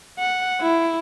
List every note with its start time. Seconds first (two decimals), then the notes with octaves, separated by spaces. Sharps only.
0.19 F#5
0.62 E4